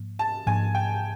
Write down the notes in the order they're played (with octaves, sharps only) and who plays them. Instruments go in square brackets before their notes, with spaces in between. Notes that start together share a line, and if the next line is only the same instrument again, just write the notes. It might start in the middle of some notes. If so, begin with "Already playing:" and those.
Already playing: [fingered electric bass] G#2 F3 A#3
[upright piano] A5
[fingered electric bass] G#2 F3 A#3 D4 [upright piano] G#5
[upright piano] G5